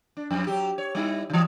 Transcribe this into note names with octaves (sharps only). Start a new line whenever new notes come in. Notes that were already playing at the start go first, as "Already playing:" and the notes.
D4
F2
F#3 G4
C#5
G3 D#4 E4
C#3 E3